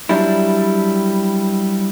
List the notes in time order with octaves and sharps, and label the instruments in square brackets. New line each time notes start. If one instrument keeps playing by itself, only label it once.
[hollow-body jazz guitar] F#3 G3 D4 E4